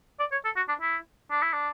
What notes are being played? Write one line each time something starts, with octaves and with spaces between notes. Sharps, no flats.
D5
C#5
A4
F#4
D4
E4
D4
E4
D4